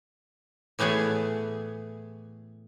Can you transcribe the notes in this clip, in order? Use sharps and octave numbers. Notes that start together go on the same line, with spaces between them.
A2 E3 A3 B3 G#4